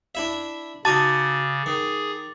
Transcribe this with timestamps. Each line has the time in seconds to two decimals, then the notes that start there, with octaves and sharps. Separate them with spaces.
0.15 D4 E4 E5
0.85 C#3 D#4 F#4 A5 D6 A6 D#7
1.66 D#3 G#4